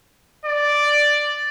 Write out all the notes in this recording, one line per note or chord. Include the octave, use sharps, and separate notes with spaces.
D5